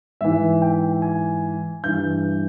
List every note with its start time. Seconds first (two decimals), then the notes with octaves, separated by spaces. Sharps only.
0.21 G#2 E3 E5
0.62 G5
1.02 G#5
1.84 G2 E3 G6